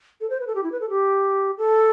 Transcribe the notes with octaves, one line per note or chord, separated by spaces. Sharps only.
A4
C5
B4
A4
G4
E4
B4
A4
G4
A4